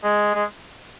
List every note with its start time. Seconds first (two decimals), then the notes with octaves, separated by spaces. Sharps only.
0.03 G#3
0.34 G#3